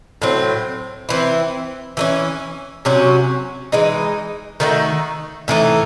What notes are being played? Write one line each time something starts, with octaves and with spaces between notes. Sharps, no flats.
A2 F#3 C4
E3 C4 E4
E3 A3 C#4
C3 F#3 C#4 F#4
E3 G#3 D#4
D#3 A3 D#4 F#4
A2 E3 A3 D#4